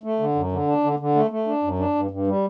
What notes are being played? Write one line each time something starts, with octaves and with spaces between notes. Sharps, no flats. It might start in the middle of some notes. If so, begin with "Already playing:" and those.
A3
D3
F#2
D3
D4
D3
D3
A3
A3
D4
F#2
D4
G2
G2
G3